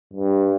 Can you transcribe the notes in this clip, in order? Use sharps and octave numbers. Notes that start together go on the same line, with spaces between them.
G2